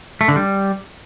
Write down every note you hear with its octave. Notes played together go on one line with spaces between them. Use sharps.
A3
D3
G3